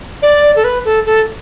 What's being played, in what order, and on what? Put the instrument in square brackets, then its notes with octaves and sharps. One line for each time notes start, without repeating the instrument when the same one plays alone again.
[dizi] D5
A4
B4
A4
A4